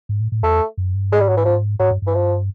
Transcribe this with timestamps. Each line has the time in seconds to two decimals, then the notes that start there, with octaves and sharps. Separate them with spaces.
0.09 G#2
0.20 A2
0.32 A2
0.43 E2 A3
0.77 F#2
0.94 G2
1.11 G#2 G#3
1.20 G3
1.28 F#3
1.37 E3
1.45 F3
1.79 G#2 F#3
1.91 G2
2.02 G2 E3
2.14 F3